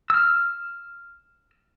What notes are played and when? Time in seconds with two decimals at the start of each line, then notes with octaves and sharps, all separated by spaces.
0.10 E6 F6